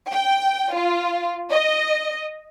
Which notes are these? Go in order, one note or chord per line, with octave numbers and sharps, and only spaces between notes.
G5
F4
D#5